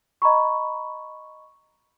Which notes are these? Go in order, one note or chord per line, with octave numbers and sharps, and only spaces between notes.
D#5 A#5 B5 C#6